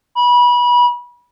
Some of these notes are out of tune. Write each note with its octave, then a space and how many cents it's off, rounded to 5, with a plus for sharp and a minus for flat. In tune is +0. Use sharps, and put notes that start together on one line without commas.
B5 -25